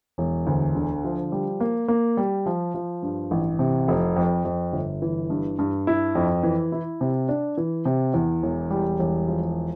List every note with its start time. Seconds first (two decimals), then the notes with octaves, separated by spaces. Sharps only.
0.18 E1
0.47 D2
0.75 D3
1.04 F3
1.32 G3
1.60 A#3
1.88 A#3
2.17 G3
2.46 F3
2.74 F3
3.02 G2
3.31 A1
3.59 C3
3.88 F1
4.16 F2
4.45 F2
4.73 G1
5.02 E3
5.30 G2
5.59 G2
5.87 E4
6.15 F2
6.43 E3
6.72 E4
7.01 C3
7.29 D4
7.57 E3
7.85 C3
8.14 E2
8.43 E1
8.71 G3
8.99 E1
9.28 F3